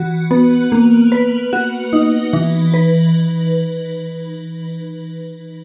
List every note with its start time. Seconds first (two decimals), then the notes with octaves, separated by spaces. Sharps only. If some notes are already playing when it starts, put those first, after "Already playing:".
Already playing: E3 F#4
0.31 B3
0.72 A#3
1.12 B4
1.53 F#4
1.93 D#4
2.33 E3
2.74 B4